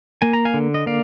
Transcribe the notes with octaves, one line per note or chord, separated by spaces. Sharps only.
A#3 G#5
A#5
F5 G#5
D3
D#5
A#3 D5 F5